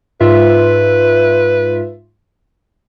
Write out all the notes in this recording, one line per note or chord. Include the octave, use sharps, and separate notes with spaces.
G#2 F4 B4 E5